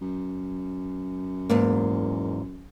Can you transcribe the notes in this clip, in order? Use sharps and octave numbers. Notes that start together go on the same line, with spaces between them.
F#2
E2 G#2 A#3